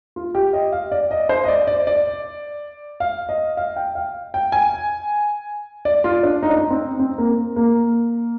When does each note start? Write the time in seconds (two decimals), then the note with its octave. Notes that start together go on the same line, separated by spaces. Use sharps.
0.16 F4
0.35 G4
0.53 D#5
0.72 F5
0.92 D5
1.11 D#5
1.29 C5
1.44 D#5
1.48 D5
1.67 D5
1.87 D5
3.00 F5
3.29 D#5
3.57 F5
3.76 G5
3.95 F5
4.34 G5
4.52 G#5
5.85 D5
6.04 F4
6.23 D4
6.43 D#4
6.50 D4
6.59 D#4
6.70 C4
6.99 C4
7.18 A#3
7.56 A#3